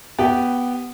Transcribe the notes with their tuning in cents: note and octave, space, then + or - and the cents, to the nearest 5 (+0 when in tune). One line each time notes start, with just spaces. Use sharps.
B3 +0 G4 -10